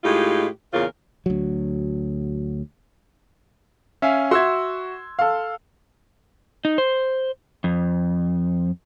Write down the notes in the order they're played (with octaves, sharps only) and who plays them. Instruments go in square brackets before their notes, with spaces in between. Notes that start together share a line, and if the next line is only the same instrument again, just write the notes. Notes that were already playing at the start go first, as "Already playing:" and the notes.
[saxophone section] A2 G#3 D#4 F4 G4
E2 A#2 C#3 F4 A#4
[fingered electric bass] D2 F#3
[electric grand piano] C#4 F5 G#5 [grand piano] E5
[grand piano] F#4 E5 [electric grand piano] C6 E6 G#6
[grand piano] A4 F5
[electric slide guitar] D#4
C5
F2